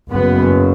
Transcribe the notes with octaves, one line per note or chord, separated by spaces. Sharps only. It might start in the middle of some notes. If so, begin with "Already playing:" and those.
F#1 F#2 C#3 B3